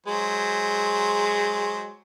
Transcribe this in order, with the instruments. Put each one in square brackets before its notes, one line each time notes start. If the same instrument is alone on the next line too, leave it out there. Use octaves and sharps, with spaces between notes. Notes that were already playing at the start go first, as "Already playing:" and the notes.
[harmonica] F#3 C5 [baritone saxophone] G#3